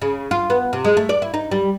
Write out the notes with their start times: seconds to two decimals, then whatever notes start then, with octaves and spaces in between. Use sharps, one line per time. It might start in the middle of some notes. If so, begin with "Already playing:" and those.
0.02 C#3
0.31 F4
0.50 B3
0.73 C3
0.85 G#3
0.97 A3
1.09 D5
1.22 E4
1.34 D#4
1.52 G3